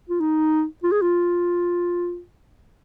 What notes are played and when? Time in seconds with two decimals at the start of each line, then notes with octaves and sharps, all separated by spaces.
0.10 F4
0.20 D#4
0.83 F4
0.92 G#4
1.02 F4